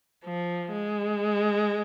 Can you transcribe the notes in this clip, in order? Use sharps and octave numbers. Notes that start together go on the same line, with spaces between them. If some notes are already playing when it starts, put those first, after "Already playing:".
F3
G#3